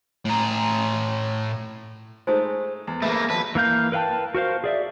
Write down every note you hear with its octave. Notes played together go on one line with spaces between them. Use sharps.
A2 A#5
G#3 A3 D#4 C5
E2
A3 A#3 G#4 B4 E5 B5
G#1 F2 B4 A5
E3 A#3 F5 G6
A#4 B4 F5 G5 A5
F#4 A#4 C5 F5
G#4 D5 E5